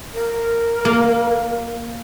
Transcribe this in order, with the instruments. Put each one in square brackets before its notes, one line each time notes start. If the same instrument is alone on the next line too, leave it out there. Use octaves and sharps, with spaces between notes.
[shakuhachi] A#4
[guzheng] A#3